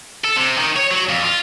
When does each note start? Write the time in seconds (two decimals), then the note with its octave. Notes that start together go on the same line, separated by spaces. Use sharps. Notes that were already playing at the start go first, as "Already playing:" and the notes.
0.25 A4
0.37 C3
0.58 D#3
0.76 C#5
0.91 F#3
1.09 F2
1.23 F4